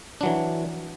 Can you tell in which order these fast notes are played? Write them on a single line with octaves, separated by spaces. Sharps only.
D4 F#3 E3